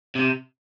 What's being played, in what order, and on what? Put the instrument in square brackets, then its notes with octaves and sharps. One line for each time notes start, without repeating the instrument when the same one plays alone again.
[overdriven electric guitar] C3